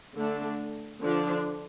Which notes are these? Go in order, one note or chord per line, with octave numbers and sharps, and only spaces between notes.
D3 A3 D4
D3 F3 D4